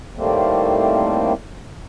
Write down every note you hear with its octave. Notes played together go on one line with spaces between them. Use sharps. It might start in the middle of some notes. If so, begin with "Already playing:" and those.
A2 D#3 G3 A3 A#3 C4